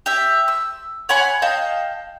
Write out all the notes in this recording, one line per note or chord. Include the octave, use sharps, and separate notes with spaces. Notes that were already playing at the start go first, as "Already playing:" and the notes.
G4 E5
E6
C#5 F#5 G#5 B5
D#5 F5 G5 A5